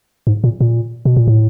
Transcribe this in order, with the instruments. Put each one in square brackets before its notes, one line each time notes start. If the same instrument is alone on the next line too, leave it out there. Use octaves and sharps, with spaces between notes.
[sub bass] G#2
A#2
A#2
B2
A#2
A2